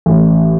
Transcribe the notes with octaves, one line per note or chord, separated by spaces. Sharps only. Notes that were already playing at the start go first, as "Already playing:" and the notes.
A1